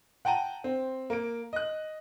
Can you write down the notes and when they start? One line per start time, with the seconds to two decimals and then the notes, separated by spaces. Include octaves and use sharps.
0.25 F#5 G5 A5 A#5 D#7
0.64 C4
1.10 A#3 D7
1.53 D#5 F#6